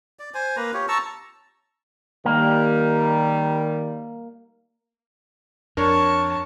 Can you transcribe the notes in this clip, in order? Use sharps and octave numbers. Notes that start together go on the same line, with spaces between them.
D5
C5 G#5
A#3 B4 A#5
F4 G4 C#5
A5 A#5 C#6 E6
D#3 G3 A#3
F2 D4 A#4 C#5 A5